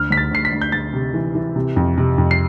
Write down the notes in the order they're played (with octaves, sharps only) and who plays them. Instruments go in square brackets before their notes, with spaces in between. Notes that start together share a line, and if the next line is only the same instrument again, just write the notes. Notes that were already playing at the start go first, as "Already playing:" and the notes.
Already playing: [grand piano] D2 F6
D2 B6
A6
D2 C7
B6
D2
G6
D2 A6
C3
E3
E3
C3
F2
C3
F2
C7